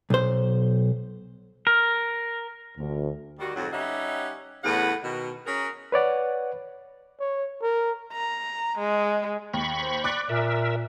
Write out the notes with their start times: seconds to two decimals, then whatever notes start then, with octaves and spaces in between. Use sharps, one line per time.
0.10 B1 C5
1.67 A#4
2.77 D2
3.39 D#3 G3 F#4
3.55 F2 G#2 F#3
3.73 G3 C#4 D#4 G4 E5 F#5
4.64 E2 A2 C#3 B4 F#5
5.04 B2 D#3
5.46 C#4 F#4 G#4 A#4
5.92 B4 C#5 D5 F#5
7.20 C#5
7.62 A#4
8.12 A#5
8.78 G#3
9.53 D#2 B5 C#6
9.83 C5
10.04 D5 D6 F#6 A6
10.29 A#2 A#4 E5